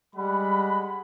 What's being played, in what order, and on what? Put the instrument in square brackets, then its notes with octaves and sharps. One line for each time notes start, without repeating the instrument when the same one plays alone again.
[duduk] G3 [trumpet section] G#3 F#5 B5